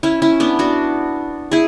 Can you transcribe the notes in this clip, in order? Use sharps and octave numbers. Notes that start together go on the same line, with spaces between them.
C#4 E4
C#4 E4
B3 D4
D4 F#4
E4 G#4